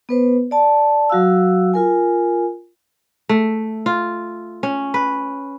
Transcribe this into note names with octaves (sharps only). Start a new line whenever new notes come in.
B3 B4 C5
D5 A5
F#3 F#4 F5 E6
F4 A#4 G#5
A3
F4
C#4
B4